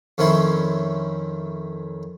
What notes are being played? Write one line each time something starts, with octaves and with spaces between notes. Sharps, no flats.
F2 D#3 C4 C#4 E4 C6